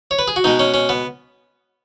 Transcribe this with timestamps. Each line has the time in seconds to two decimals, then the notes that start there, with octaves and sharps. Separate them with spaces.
0.11 C#5
0.19 B4
0.28 G#4
0.36 F#4
0.44 B2 G#3 D#4
0.60 C#4
0.74 C#4
0.89 B3